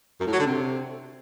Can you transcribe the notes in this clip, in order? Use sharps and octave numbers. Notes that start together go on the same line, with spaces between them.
F#2
A2
F#3
D3
C3